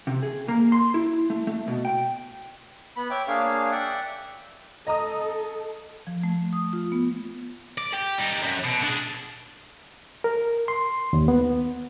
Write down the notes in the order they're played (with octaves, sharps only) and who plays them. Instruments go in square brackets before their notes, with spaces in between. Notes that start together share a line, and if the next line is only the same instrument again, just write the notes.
[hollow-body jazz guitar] C3
G#4
A#3
C6
E4
A3
A3
B2
G5
[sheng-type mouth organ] B3 B5
C#5 E5 G5 D6
A#3 D4 G#4 C#5 F5
D5 E5 F#5 G5
[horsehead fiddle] A4 [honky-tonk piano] D#5 A#5 D#6
[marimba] F3
A3
D#6
F4
B3
[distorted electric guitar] D5
G4
G3 D#4
F#2
B2
D4 G#4
[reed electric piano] A#4
C6
D#2
B3